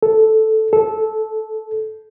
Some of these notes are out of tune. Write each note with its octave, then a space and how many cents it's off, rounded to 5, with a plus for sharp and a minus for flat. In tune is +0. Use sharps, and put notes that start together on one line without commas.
A4 -5
A4 -15